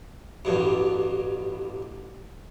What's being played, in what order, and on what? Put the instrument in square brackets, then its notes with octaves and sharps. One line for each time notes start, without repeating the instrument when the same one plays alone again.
[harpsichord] A1 G2 B2